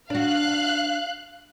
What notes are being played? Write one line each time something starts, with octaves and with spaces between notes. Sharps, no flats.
D4 F#4 F5 F#6